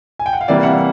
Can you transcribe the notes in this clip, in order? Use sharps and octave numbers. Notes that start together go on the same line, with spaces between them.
G#5
G5
F#5
F5
C3 E3 G3 A#3 D5 E5
E5 F#5